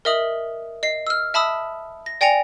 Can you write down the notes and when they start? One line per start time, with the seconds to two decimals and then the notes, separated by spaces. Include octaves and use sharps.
0.05 A#4 D#5 E5 D#6 F#7
0.83 D#5 C7
1.07 E6 F6
1.34 E5 A5 B5 D#6 E6
2.06 A#6
2.21 D5 G5 G#5 A#6 C#7 F7